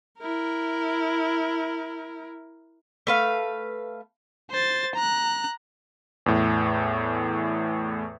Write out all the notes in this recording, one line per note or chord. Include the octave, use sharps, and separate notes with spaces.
E4 A#4
A3 B4 F5
C5 A6
A#5 F#6
E2 A2